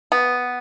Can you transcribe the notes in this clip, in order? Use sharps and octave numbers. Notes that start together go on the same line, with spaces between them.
B3